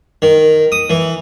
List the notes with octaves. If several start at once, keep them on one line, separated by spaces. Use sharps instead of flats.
D#3
D#6
E3